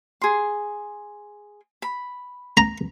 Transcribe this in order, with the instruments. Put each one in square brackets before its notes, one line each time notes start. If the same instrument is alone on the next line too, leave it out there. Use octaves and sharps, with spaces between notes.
[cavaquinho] G#4 C6
B5
[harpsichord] A#5